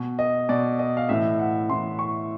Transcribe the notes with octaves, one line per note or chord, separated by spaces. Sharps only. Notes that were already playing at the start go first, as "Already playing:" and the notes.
Already playing: B2
D#5
B2 D5
D#5
F5
A2 E3 E5
F#5
A2 E3 C6
C#6